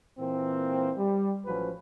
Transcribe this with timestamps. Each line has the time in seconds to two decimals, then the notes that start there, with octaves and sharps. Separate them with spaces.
0.19 A#2 E3 A#3 C4
0.97 G3
1.46 A1 F3 F#3 C#4 B4